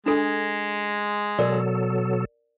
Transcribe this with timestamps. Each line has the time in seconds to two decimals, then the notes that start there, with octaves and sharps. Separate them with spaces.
0.06 G#3 D4 A4
1.39 B2 F#3 A4 A#4 D5